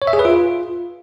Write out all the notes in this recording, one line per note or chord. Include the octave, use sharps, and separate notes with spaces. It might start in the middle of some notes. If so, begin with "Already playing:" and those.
C#5
E5
G#4
B4
F4